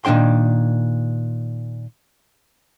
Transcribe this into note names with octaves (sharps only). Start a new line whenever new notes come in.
A#2 D#3 D4 G5 C6